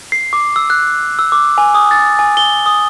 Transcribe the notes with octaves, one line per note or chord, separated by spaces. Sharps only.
C7
D6
E6
F#6
E6
D6
G#5
D#6
A6
G#5
G7
D#6